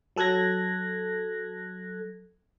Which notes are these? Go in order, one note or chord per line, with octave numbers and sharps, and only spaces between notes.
F#3 A4 F#6 G#6 A#6